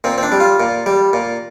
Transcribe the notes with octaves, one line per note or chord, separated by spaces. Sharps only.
A#2 C4
C4
D4
G3
F4
A#2
G3
A#2